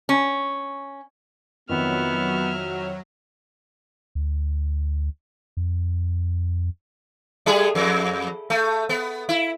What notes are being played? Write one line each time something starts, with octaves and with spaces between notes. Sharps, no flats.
C#4
F2 D#3 F#3 B3 E5 F6
D2
F2
G3 A3 G#4
F2
A3
B3
E4